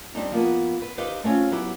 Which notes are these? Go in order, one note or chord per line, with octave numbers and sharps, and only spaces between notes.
G3 C4 D4 D#4
F3 A#3 B3
B4
D#4 G4 B4 C5 F5
A3 C4 C#4 F4
F#3 B3 E4 G4